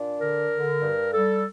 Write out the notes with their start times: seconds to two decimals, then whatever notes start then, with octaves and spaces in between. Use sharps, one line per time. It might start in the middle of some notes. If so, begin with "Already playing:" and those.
Already playing: A#2 D4
0.19 D3 A#4
0.50 D3
0.82 G2
1.12 G3 A4